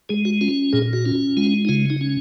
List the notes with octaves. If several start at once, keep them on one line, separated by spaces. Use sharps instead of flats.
G#3 G#4
F#4
C#4 F4
A#2 G#4
F#4
C#4 F4
G#3 F4
D#4
C#3 F4
D#4
C#4